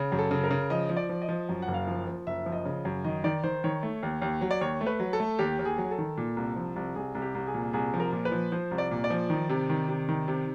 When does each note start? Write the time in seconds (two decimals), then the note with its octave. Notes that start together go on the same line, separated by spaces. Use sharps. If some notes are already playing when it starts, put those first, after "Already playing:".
Already playing: C#3
0.12 F#2
0.19 A4
0.31 C#3
0.44 A#4
0.51 C#3
0.70 F3 D#5
0.89 F3
0.97 D5
1.09 F3
1.22 D#5
1.28 F3
1.49 F#2
1.62 F#5
1.68 F#1
1.74 F5
1.87 F3
2.07 F3
2.26 F#1 E5
2.46 F3
2.52 D#5
2.65 C#3
2.85 F#2
3.05 D#3 D#5
3.24 D#3 D5
3.44 D#3 C5
3.64 D#3 C#5
3.83 A3
4.03 D#2
4.22 D#2
4.41 F#3
4.51 D5
4.61 D#2 C#5
4.81 A3
4.87 B4
5.00 F#3
5.13 A4
5.20 A3
5.39 D#2 G4
5.59 D#2
5.65 G#4
5.78 F#3
5.91 A4
5.98 D#3
6.17 A#2
6.37 C2
6.56 F3
6.76 C2
6.95 C2 G#4
7.15 C2
7.22 G4
7.35 C2
7.47 G#4
7.54 A#2
7.73 C2 G#4
7.94 F3
8.00 A#4
8.12 A#2
8.25 B4
8.32 F3
8.52 F3 C5
8.71 C2
8.78 D5
8.91 A#2
9.04 D5
9.10 F3
9.30 D#3
9.49 C3
9.69 D#3
9.88 C3
10.09 D#3
10.28 C3